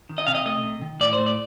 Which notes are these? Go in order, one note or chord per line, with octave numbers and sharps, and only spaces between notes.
D#3
D#5
C3 F5
D#5
A3 D#5
C3
D#3
A2 D5
C5
A3
D5